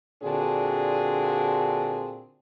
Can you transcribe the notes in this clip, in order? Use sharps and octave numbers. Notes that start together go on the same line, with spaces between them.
A#2 D3 C4 D4 F#4 G#4